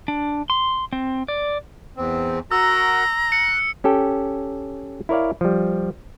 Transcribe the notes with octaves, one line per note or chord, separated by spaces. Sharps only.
D4
C6
C4
D5
E2 C4
F#4 A#4 A#5 E6
F#6 C#7
C#4 G4 A4 G5
E4 A#4 C#5 D5 F5
F3 G3